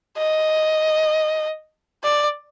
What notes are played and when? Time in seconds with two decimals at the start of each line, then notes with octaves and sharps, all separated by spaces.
0.17 D#5
2.03 D5